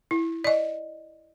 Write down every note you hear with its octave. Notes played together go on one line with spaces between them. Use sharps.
E4
D5 D#5